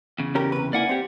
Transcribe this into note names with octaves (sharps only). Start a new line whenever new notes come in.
E2 C#3
C#4 G4 A#4
C3 B4
A#3 E4 D5 F#5 G#5
C4 G4